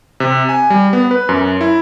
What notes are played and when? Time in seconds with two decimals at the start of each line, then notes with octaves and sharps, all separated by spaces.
0.20 C3
0.49 G#5
0.70 G3
0.93 B3
1.11 B4
1.29 F#2
1.61 E4